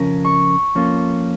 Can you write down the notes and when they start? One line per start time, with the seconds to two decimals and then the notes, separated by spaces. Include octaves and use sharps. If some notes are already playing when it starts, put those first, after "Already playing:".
Already playing: F2 C#3 F3 C#4 A#4
0.25 C#6
0.75 F2 F3 A#3 C#4 F4